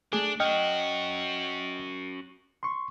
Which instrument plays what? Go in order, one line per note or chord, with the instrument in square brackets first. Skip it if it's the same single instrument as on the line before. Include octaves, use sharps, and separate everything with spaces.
[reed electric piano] A3 G#4 [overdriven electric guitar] D4
[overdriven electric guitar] C#4 F#4 [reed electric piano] D#5 G5 F6
[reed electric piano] C6 C#6